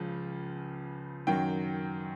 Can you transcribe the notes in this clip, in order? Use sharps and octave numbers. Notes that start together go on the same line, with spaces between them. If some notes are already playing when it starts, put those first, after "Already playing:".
Already playing: C#2 C#3 F3
F#2 D#3 F#3 G5